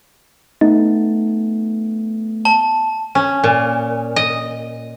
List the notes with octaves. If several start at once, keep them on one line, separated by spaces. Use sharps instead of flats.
A3 B3 D#4
A5
C#4
A#2
D#5